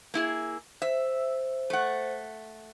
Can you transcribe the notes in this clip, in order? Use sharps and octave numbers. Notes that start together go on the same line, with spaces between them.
A#3 E4 G#4
C5 E5
A3 F#5